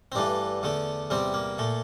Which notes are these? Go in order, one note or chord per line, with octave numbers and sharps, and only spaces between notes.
C4
G2 E3 A3 D4
E2 D3 A3
E2 C3 G3 C4
A#3
A#2 A3